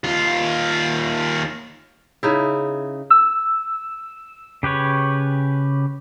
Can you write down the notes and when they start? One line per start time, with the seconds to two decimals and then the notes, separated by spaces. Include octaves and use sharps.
0.04 D#2 F4
2.23 C#3 D#4 E4
3.10 E6
4.63 C#3 G4 B4 C#5